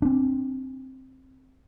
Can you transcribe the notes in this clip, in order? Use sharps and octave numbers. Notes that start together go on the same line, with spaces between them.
C4 D4